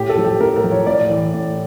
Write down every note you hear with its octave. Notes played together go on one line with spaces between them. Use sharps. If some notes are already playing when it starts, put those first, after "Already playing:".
Already playing: A2 G4
A4
F3
G4
A2 A#4
A#4
F3
C#5
A2 D5
E3
A2